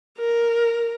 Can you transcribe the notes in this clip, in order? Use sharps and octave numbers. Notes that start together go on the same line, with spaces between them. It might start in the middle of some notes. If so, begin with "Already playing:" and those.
A#4